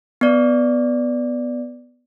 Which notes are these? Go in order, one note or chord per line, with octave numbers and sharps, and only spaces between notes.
B3 D5